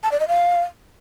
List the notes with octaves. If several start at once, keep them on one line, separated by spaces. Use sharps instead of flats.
A5
D5
D#5
F5